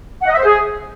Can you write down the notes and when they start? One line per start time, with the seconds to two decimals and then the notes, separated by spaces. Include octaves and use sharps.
0.23 F#5
0.28 D#5
0.34 E5
0.39 C5
0.45 G#4